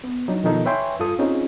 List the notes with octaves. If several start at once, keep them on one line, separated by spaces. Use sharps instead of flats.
B3
F#3 D4 D#4
B2 D#3 F3 D#4 A4
B4 C#5 E5 G5 G#5 C6
G2 F4 A4 D#6
C4 C#4 D#4 F4 G#4